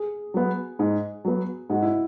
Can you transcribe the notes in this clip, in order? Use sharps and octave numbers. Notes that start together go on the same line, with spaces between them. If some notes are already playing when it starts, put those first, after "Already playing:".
Already playing: G#4
F#3 B3
G#2
F#3 B3
G#2 F#4
E4